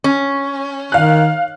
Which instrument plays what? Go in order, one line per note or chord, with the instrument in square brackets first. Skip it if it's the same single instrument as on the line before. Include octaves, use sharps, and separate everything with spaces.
[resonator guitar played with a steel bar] C#4
[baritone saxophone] D#3 [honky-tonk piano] F5 F#6